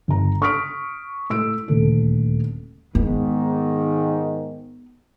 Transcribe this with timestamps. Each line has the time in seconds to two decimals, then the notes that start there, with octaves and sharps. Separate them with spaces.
0.08 G1 A#5
0.42 C#6 D#6 F6 B6 D7
1.30 A2 E6 D7
1.68 D#1 D2 A4
2.95 G#2 D#3 B3